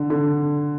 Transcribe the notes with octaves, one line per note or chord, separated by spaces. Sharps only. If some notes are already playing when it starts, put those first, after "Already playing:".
Already playing: D3
D3